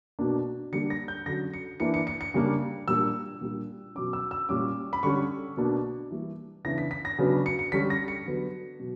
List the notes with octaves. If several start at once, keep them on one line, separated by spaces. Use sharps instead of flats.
B2 A#3 D4
D3 G3 A#3 D4 C#7
A#6
G6
D3 F#3 C#4 A#6
C#7
E3 A#3 D4 C#7
C#7
C#7
C#7
C#3 G3 A#3 D4
A#2 G3 A#3 D4 E6
A#2 G3 A#3 D4
B2 F#3 C#4 D6
E6
E6
A#2 G3 C#4 D6
B5
D3 G3 C#4 C#6
B2 A#3 D4
E3 G3 A#3
C#3 E3 B3 D4 A#6
B6
B6
A#6
C#3 F#3 B3 D4
C#7
C#7
D3 G3 C#4 B6
A#6
C#7
D3 F#3 B3
B2 F#3